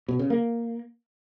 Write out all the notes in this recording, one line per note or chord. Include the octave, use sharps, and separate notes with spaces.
B2
C#3
A#3